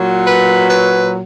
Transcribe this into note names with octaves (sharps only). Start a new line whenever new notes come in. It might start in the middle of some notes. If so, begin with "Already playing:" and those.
Already playing: A#2 F#3
B4
B4